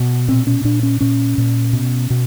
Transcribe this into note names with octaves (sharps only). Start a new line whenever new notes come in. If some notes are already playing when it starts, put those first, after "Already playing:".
Already playing: B2
A#2 C4
C#4
A#2 D4
C#4
A#2 C#4
A#2
B2
B2